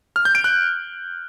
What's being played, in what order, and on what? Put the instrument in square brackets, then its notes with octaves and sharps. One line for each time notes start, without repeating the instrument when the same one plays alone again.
[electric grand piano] F6
G6
D7
F#6